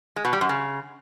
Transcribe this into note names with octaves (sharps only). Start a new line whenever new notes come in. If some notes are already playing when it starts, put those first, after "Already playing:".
G#3
B2
G3
F#2
C#3